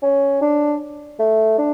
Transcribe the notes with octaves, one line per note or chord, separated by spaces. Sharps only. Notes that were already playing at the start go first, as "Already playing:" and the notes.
C#4
D4
A3
D4